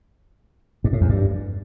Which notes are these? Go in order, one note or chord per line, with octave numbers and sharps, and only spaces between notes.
G2
A2
E2
G2